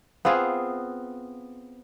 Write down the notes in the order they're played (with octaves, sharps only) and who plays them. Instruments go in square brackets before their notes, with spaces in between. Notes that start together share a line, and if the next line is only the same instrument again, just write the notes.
[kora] B3 C4 F4 G#4